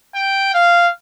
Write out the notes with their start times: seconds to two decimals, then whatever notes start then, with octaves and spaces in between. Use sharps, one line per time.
0.15 G5
0.54 F5